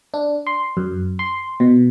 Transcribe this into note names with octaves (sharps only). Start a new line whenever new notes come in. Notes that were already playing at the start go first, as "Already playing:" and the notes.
D4
C6
F#2
C6
B2